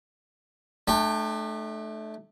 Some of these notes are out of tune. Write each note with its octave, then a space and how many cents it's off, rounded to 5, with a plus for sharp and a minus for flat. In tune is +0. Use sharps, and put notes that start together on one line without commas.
A3 -20 D4 +40 G5 +25